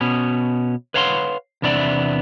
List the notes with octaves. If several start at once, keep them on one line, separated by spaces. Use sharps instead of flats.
B2 B3 C#4
B4 C#5 F5 F#5 A#5 C6
E2 C3 B3 D4 D5 E5